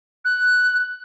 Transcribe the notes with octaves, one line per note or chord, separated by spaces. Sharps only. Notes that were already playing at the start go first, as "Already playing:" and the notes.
F#6